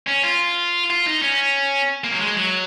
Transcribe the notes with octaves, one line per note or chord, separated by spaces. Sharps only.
C#4
F4
F4
D#4
C#4
A#3
F#3
G#3
F#3